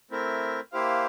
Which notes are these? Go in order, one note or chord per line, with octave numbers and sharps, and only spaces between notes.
A3 C4 E4 A#4
A#3 E4 G4 C5 F5